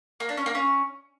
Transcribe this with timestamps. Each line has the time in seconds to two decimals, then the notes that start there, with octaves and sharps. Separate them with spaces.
0.20 A#3
0.29 D4
0.37 C#4
0.46 A#3
0.55 C#4